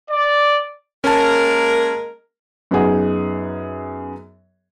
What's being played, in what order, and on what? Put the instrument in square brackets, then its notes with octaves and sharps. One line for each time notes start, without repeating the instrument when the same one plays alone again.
[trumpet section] D5
[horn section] G#3 A#3 A#4 [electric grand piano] C#4 A5
[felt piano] F#2 B3 D#4 G#4 F#5